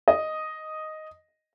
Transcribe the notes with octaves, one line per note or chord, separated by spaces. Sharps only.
D#5